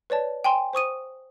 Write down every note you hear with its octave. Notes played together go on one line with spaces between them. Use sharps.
B4 C#5 D5 A5
G5 G#5 C6
C5 C#6 D#6 D#7